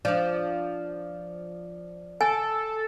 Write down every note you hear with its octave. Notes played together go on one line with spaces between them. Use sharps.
F3 D4 D5
A4 G#5